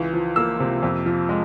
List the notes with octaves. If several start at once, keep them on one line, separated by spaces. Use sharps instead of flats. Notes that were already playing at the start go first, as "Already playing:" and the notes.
Already playing: C#2 E3
F3
A#3 E6
C3
F2
F3
G#3